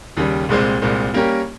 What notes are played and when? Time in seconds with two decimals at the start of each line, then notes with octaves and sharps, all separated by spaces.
0.17 D#2 C#3 G3
0.49 C2 A#2 G#3 C4
0.82 C2 A#2 G#3 C4
1.14 G3 A#3 C#4 G4 A#4